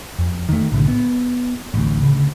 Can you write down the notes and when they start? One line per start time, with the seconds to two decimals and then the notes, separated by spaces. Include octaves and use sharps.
0.19 F2
0.49 D#3 A3
0.72 B1 A2 D3
0.88 B3
1.74 A1 D2
2.03 D2 C#3